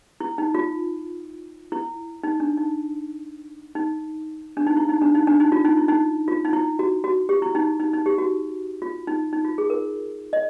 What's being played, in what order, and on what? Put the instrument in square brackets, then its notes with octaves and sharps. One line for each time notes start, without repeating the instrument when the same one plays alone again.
[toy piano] E4
D#4
F4
E4
D#4
D4
D#4
D#4
D4
D#4
E4
D#4
D4
D#4
D4
D#4
F4
D#4
E4
D#4
F4
D#4
E4
F#4
F#4
G4
E4
D#4
D#4
D#4
G4
F#4
F4
D#4
D#4
F4
G#4
A#4
D#5